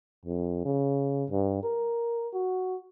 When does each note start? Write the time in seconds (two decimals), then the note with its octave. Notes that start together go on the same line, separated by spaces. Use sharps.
0.26 F2
0.65 C#3
1.30 G2
1.63 A#4
2.33 F#4